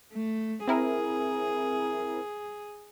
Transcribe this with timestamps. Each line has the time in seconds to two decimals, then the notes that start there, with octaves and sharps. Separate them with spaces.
0.13 A3
0.67 C4 E4 G#4 A#4